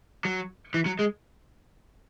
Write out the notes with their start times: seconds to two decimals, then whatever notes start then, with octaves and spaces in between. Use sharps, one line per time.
0.25 F#3
0.74 E3
0.86 F#3
0.99 G#3